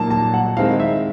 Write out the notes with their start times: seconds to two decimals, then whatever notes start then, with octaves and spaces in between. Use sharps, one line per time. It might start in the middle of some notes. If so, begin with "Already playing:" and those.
Already playing: A#2 F#3 A#3 D#4 A5
0.11 A5
0.34 F#5
0.57 D#3 G#3 C4 E4 F5
0.80 E5